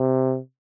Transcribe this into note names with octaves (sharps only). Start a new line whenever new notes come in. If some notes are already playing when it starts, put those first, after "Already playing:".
Already playing: C3